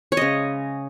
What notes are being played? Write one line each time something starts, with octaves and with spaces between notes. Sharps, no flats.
C#5
C#3 G#3 D#5